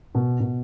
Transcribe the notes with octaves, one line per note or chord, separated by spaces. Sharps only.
B2
B2